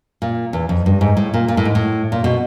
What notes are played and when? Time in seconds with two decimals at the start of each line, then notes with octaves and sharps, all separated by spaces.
0.22 A#2
0.53 E2
0.69 F2
0.86 G2
1.01 G#2
1.17 A2
1.34 A#2
1.48 A#2
1.57 A2
1.65 G#2
1.75 A2
2.12 A#2
2.24 B2